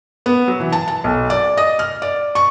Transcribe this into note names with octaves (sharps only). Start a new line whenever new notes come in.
B3
F#3
E3
A5
A5
B1
D5
D#5
F6
D5
C#6